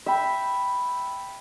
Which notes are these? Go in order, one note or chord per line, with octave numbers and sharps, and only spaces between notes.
E5 G5 B5